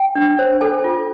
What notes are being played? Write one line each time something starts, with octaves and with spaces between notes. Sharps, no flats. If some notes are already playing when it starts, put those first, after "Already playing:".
Already playing: G5
D4
C5
A4 G#5
F4